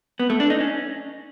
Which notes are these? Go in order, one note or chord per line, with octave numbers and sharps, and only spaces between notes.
B3
A3
D4
D#4
C#4